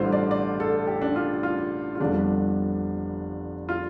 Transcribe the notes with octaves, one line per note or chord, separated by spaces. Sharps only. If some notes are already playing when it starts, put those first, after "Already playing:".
Already playing: A1 G2 D3 G3 F4 C5
D5
D5
A4
G4
D4
F4
F4
F4
G1 F2 D3 G3 D4
F4